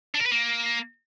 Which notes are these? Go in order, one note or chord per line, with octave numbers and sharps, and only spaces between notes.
D4
A#4
B4
A#3